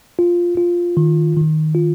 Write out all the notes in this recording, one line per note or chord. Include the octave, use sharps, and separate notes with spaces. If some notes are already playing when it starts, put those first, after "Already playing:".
F4
F4
D#3
D#3
F4